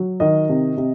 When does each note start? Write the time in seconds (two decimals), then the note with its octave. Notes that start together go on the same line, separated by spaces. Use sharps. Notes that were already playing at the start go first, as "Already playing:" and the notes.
Already playing: F#3
0.20 D#3 D#5
0.49 C3
0.77 C3